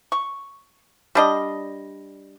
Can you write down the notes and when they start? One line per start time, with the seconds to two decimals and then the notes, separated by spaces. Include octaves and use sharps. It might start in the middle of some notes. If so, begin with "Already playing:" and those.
0.12 C#6
1.15 G3 D4 D#5